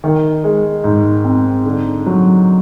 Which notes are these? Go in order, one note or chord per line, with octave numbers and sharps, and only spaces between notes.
D#3
G#3
G#2
C4
D3
F#3